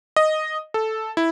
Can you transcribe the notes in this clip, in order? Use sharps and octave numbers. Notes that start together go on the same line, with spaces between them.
D#5
A4
E4